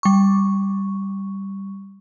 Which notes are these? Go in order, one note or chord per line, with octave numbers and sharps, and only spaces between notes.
G3 C#6